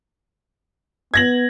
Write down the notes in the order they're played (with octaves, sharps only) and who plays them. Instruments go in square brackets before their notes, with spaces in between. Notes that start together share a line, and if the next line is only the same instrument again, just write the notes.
[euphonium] B3 [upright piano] G#6 A#6 F#7